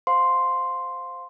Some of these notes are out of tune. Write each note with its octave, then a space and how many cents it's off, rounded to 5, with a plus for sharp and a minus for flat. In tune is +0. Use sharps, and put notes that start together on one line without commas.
C5 +0 F5 +15 C6 +0